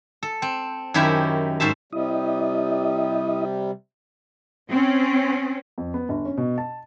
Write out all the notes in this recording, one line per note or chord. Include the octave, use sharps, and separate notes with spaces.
A4
C4
F#2 D#3 C#4 E4 G4 E5
G#2 C#4 C5 E5 A5
C3 G3 E4 D#5
C4 C#4
F2
B3
G1
C#4
B2
A5